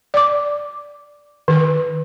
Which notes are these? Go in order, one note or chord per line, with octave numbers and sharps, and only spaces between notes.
D5 D6
D#3 B4